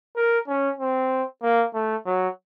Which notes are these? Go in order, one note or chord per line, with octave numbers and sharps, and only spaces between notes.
A#4
C#4
C4
A#3
A3
F#3